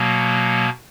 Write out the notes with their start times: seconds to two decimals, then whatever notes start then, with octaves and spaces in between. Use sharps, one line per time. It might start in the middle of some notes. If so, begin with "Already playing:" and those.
Already playing: B2 F#3 A#3